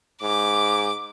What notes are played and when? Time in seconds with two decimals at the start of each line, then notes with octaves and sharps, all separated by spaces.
0.22 G#2 D6